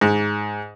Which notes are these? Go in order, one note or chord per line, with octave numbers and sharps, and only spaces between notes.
G#2